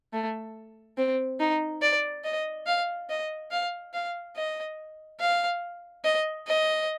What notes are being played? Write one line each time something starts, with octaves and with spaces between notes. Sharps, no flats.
A3
C4
D#4
D5
D#5
F5
D#5
F5
F5
D#5
F5
D#5
D#5